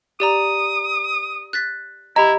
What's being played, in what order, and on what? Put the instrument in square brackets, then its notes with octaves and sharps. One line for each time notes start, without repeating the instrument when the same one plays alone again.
[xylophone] G4 D5 A#5 [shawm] D#6
[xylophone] F#6 A6 B6
[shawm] E4 [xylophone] G4 D#5 [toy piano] A#5 B5